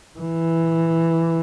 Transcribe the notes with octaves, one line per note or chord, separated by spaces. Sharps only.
E3